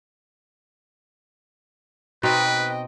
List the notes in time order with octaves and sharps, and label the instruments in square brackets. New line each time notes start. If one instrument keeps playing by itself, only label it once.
[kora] B2 C4 D#4 [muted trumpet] B4 [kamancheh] D#5 G5